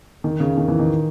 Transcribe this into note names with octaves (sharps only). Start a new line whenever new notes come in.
D#3
C#3
D#3
E3
D#3